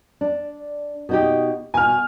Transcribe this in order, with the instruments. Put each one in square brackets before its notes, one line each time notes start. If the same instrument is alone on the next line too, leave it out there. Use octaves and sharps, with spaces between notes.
[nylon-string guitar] D4
B2 D#4 G4
[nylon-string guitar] B2 [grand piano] G#5 F6